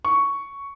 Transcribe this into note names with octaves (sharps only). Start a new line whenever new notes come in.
C#6